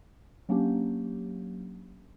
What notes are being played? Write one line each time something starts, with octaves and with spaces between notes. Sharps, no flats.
F#3 A#3 C#4 D4 G4